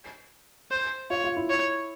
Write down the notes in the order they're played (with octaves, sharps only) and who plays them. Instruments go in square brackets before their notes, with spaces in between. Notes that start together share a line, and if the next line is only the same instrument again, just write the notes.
[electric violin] C5
[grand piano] F4 [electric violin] C#5
[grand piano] F4
E4
[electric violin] C#5